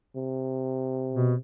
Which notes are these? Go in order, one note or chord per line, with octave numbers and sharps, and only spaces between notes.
C3
B2